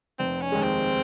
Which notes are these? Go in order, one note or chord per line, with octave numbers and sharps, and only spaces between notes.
F1 C4
C#4
D#2 D#3 G#3
C4